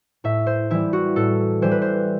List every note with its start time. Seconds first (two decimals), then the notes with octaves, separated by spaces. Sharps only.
0.24 A2 E5
0.47 C5
0.70 E3 G3 E4
0.93 F#4
1.16 A2 A4
1.62 E3 G3 C5
1.71 B4
1.82 C5